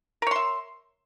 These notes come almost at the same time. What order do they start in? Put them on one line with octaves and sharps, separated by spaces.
A#4 C#5 C6 E5